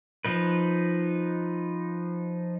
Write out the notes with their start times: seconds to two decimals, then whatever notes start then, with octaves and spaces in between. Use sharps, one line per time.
0.25 F3 D#4 B4